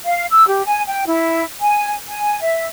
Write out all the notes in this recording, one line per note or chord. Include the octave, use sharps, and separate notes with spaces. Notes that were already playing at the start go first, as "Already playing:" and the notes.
F5
E6
G4
G#5
G5
E4
G#5
G#5
E5